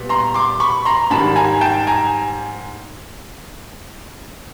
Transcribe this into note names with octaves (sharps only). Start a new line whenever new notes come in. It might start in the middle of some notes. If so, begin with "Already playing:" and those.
Already playing: A#2 G3 B3
A#5 C6
C6 D6
B5 C#6
A#5 C6
G#2 D#3 G3 A5 B5
G#5 A#5
G5 A5
G#5 A#5